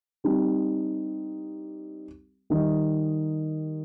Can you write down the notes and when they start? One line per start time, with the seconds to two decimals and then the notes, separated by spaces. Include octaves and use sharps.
0.24 G3 C4 D#4 G4
2.50 D#3 G3 D#4 G4 D#5